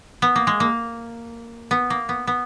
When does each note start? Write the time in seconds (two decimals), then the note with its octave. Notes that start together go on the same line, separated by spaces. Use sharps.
0.22 B3
0.36 A#3
0.47 G#3
0.60 A#3
1.71 B3
1.90 A#3
2.09 B3
2.27 B3